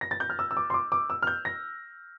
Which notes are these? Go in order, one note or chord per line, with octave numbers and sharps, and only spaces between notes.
A#6
A6
G6
F6
E6
E6
D6
C6
D6
D6
E6
F6
G6
A#6